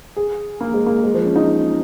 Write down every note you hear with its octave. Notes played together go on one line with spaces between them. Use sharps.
G#4
A#3
G#3
A#3
G#3
F3
C#4
D#4